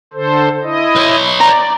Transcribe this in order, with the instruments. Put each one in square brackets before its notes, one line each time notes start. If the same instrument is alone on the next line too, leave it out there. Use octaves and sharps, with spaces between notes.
[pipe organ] D3 A4 C5
E4 D#5
[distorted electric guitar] B4 C#5
[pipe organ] D5 [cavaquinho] A#5